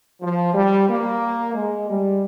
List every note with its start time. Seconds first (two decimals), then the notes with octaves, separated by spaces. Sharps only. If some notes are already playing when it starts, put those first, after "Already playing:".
0.22 F3
0.55 G3
0.88 A#3
1.55 G#3
1.89 G3